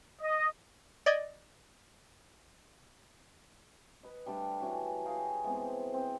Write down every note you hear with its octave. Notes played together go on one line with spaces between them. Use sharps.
D#5
D5 D#5 G#6
B4 D#5
G3 A3 D4 A5
E3 C#4 F#4
G4 G#4 A#4 F5
E3 G#3 B3 C4
C4